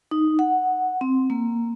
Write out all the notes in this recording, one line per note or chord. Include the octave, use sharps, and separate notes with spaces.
D#4
F#5
C4
A#3